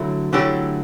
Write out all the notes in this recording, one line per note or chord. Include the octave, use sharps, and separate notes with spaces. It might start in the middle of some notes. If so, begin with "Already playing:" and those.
Already playing: D3 F#3 A3 E4
D3 F#3 A3 E4 G4